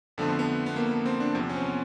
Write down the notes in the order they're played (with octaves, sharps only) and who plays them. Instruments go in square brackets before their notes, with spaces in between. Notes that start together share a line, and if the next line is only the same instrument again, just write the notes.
[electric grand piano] F2 D3 F3 A3 B3
C4
B3
B3
A#3
B3
C4
D4
E2 C3 F3
C#4
C4
B3